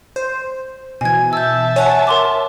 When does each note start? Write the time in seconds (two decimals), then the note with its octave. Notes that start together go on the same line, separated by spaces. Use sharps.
0.16 C5
1.01 B2 E3 G#5 G#6
1.33 E5 A5 E6 G6
1.76 C#5 F#5 G#5
2.07 A#4 C6 D6